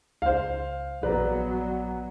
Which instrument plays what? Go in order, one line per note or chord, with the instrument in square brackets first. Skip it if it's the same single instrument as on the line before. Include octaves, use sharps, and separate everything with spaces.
[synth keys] C#2 [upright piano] C5 F5
[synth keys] A#1 D5 A#5 [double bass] F#3 B3 [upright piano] B4